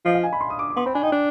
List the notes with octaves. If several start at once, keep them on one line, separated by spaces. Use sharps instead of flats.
F3 D#5
F5
G#5
B5
C6
D#6
D6
D6
B3 C6
C4 B5
D4 G#5
D#4 G5
D4